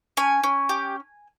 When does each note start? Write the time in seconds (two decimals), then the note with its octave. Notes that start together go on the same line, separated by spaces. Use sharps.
0.17 C#4 G#5
0.44 C#4
0.69 G4